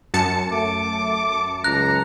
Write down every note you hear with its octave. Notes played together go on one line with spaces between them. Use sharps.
F#2 A5 C#7
A3 D6
C#2 A#5 F#6